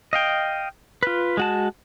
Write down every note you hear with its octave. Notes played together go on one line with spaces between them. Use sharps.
D#5 F5 G5
F4 B4
G#3 F#4 A5